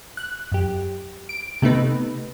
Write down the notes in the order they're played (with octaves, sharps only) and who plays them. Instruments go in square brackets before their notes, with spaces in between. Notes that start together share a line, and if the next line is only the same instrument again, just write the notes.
[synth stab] F#6
F#2 G4
D7
C3 A3 B3 D#4 B4